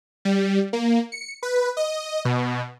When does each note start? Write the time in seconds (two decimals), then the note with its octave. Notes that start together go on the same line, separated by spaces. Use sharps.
0.25 G3
0.73 A#3
1.12 C#7
1.43 B4
1.77 D#5
2.25 B2